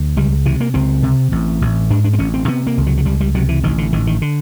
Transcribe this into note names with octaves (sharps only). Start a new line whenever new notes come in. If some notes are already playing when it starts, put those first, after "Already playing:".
Already playing: D2
C#2 G3
C3 E3
A#3
C#2 C4
C3
A1
A1
G#2 D4
D4
C4
A1 C#4
C4
C3 B3
A#3
C#2
F#3
F#3
C#2 G3
G3
C3 F#3
E3
A1 D#3
D3
A1 D#3
D#3
D3